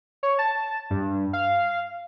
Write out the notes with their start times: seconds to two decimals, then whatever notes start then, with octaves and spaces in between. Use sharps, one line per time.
0.23 C#5
0.39 A5
0.90 G2
1.33 F5